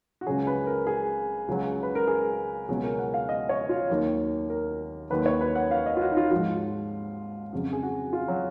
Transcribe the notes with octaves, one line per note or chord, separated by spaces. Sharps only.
F#4
C#2 C#3 F#3 G#4
B4
A#4
G#4
C#2 C#3 F#3
B4
A#4
G#4
C#2 B2 F#3 G#4
A#4
F#5
F5
D#5
C#5
F4
D#2 D#3 F#3 F#4
A#4
D#2 D#3 F#3 B4
C#5
B4
F#5
F5
D#5
F4
F#4
D#4
F4
G#2 F3 F4
F2 C#3 F#3
G#4
F#4
F4
F#3